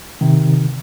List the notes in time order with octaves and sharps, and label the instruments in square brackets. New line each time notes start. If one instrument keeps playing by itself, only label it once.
[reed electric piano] C3 D#3